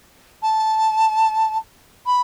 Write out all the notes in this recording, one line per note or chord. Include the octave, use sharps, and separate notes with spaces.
A5
B5